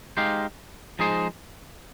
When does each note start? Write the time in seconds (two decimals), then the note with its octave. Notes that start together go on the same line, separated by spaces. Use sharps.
0.17 G#3 D#4 G4 C5 F5
0.99 F3 G#3 D#4 G#4 C5